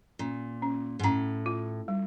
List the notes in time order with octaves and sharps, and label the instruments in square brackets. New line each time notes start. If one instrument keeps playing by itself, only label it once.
[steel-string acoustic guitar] A#2 [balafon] C#4
[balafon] C#4
[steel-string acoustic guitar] G#2
[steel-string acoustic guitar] A2 [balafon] C#4
[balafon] F4
G3